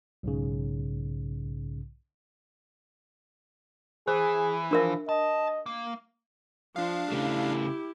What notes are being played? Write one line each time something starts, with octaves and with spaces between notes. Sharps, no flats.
B1 G#2 C#3
E3 G#4 C5
F3 D4 A#4 E5
D#5 A5
A#3
F3 D4 F5
C#3 A3 E4 G4